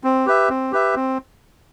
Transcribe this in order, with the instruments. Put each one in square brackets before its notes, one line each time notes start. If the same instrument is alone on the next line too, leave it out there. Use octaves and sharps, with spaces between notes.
[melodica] C4
G4 B4 E5
C4
G4 B4 E5
C4